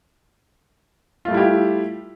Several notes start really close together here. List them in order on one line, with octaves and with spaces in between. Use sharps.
F4 A3 G3 E4 G4